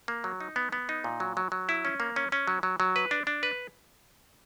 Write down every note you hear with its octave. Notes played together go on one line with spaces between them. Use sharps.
A#3
F#3
D#4
B3
B3
D#4
A#2
F#3
F#3
F#3
E4
C#4
A#3
C#4
C#4
F#3
F#3
F#3
B4
D4
D4
B4